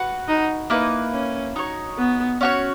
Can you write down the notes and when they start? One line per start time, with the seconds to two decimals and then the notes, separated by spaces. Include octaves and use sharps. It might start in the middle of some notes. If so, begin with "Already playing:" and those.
Already playing: F#4 B4 F#5
0.28 D#4
0.70 A#3 D#4 E4 B4
1.13 C#4
1.56 D#4 F#4 C#5
1.98 B3
2.41 C#4 F#4 C#5